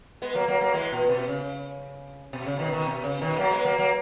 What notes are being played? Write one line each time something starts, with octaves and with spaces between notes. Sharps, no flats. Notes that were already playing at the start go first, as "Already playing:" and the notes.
G#3 B3
F#3 A#3
F#3 A#3
F#3 A#3
E3 G#3
A#2
B2
C#3
B2
C#3
B2 D#3
B2 D#3
B2
C#3
B2 D#3
F#3 A#3
G#3 B3
F#3 A#3
F#3 A#3